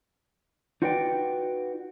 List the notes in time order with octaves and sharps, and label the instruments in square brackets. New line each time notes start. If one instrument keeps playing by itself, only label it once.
[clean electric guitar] D#4 F4 F#4 B4 D5 G5